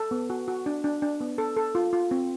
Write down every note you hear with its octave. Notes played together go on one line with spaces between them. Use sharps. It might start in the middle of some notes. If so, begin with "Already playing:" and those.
Already playing: A4
B3
F#4
F#4
D4
D4
D4
B3
A4
A4
F4
F4
C4